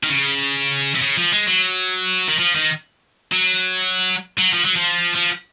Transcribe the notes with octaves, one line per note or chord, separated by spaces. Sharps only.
D#3
C#3
C3
C#3
F3
G#3
F#3
D#3
F3
D#3
F#3
F#3
F3
F#3
F3
F3